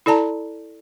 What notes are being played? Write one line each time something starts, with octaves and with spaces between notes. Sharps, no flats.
E4 A4 D5 A5 A#5